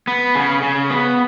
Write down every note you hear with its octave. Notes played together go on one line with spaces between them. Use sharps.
B3
C#3
C#3
B3